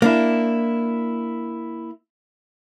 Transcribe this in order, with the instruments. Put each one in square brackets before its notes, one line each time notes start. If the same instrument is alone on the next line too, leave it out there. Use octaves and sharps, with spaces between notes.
[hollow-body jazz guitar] A#3 D4 E4